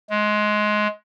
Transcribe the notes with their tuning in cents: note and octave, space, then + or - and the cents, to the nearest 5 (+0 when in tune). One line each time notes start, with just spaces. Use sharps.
G#3 +20